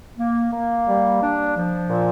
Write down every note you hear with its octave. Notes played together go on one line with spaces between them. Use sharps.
A#3
A#3
G3
D4
F3
A#2